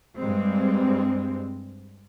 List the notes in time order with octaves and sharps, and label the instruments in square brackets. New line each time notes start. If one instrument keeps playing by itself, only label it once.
[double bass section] G2 G3 G#3 C4